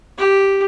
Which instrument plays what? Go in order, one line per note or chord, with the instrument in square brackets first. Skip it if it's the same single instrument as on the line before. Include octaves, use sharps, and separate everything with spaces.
[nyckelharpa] G4